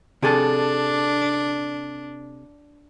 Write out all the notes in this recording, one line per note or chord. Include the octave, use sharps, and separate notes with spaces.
C3 D4 G#4 A4